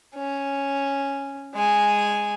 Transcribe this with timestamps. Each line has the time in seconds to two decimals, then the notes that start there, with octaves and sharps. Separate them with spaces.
0.15 C#4
1.55 G#3 G#5